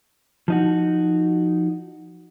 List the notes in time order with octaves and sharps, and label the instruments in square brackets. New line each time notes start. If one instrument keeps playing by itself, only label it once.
[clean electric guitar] F3 D#4 F#4